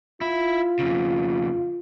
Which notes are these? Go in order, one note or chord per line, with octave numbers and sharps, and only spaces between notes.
E4 F4
F2 C#3